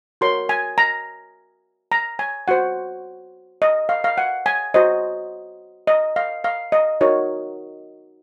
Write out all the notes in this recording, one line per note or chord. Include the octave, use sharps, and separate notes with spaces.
F#4 A#4 C#5 C6
G#5
A#5
A#5
G#5
F#4 C5 F#5
D#5
F5
F5
F#5
G#5
F#4 C5 D#5
D#5
F5
F5
D#5
D#4 F#4 A#4 C#5